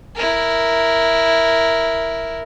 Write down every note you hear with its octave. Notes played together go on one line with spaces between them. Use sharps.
E4 A#4